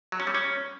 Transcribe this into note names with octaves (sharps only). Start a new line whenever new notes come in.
F#3
C#4
G3
C#4